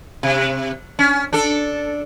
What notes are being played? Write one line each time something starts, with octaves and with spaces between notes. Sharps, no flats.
C3
C#4
D4 A4